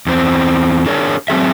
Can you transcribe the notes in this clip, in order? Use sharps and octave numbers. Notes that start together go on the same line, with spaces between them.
E2 C4
D4 G#4 A#4 C#5
F#3 C4 G#4 E5